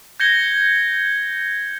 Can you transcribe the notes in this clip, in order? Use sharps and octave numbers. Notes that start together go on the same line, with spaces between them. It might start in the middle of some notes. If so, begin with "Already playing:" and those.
G6 G#6 A#6 C#7 G7